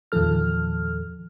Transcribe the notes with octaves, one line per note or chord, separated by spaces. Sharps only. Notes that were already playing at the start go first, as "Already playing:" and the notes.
E2 A#2 D#3 F3 A4 F6